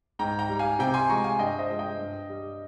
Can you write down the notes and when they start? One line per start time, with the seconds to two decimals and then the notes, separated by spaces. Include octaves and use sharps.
0.19 G#2 G5 A#5
0.39 G5 A#5
0.49 G3
0.59 F5 G#5
0.79 C3 G5 A#5
0.94 G#5 C6
1.09 F3 G#3 A#5 C#6
1.24 F5 G#5
1.39 G2 D#5 G5
1.59 C5 D#5
1.70 F3 G#3
1.79 D#5 G5
1.98 G2
2.29 G3